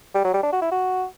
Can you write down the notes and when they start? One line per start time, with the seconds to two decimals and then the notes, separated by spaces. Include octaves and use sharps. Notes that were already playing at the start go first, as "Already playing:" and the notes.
0.15 G3
0.24 F#3
0.34 G3
0.43 D4
0.52 F#4
0.62 E4
0.71 F#4